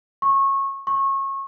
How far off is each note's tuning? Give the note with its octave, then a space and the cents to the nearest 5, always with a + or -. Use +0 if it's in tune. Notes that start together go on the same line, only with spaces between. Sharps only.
C#6 -20
C#6 -25